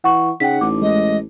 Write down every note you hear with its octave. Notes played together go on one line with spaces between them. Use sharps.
E3 F#5 C#6
C#3 D#4 F#5 G5 B6
A1 D6
G#3 D#5